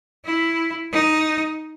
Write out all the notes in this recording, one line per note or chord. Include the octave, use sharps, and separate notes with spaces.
E4
D#4